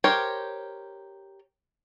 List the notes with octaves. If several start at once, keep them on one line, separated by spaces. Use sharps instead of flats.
G4 A#4 C5 C#5